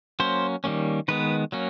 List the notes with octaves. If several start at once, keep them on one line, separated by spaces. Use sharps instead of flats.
F#3 A#3 C#4 C5
D#3 G3 A#3 C#4
D#3 G#3 B3 B4
F#3 A#3 C#4